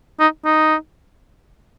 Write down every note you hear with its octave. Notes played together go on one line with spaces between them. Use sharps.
D#4
D#4